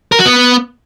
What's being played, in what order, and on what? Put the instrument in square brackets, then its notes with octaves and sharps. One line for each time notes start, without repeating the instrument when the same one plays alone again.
[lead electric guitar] A#4
F#4
B3